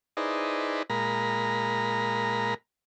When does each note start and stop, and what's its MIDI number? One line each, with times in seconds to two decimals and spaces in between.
0.17 0.83 63
0.17 0.83 64
0.17 0.83 68
0.17 0.83 71
0.17 0.83 72
0.17 0.83 74
0.90 2.54 46
0.90 2.54 56
0.90 2.54 70
0.90 2.54 82
0.90 2.54 83